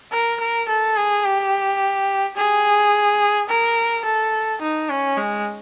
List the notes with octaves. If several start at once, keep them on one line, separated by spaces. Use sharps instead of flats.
A#4
A#4
A4
G#4
G4
G#4
A#4
A4
D#4
C#4
G#3